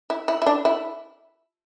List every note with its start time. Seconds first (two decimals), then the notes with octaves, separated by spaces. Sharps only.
0.10 E4
0.28 E4
0.42 E4
0.46 D4
0.65 E4